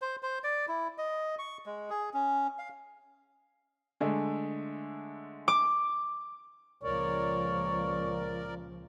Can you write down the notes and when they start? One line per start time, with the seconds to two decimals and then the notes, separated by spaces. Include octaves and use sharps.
0.02 C5
0.23 C5
0.44 D5
0.68 E4
0.98 D#5
1.39 C#6
1.66 G#3
1.90 G#4
2.14 C#4
2.59 F5
4.00 D3 G#3 A3
5.48 D6
6.84 C#2 A#2 F3 A#4 C#5 D5